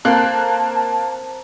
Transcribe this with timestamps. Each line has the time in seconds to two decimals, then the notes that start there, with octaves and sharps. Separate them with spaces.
0.05 A#3 C4 A4 C5 A5 A#5 F#6